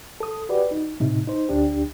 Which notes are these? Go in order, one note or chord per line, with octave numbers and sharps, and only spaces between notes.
A4 D#6
F#4 G4 B4 D5
D#4
A2 C3 D#4
D#4 C5
D2 D4 G4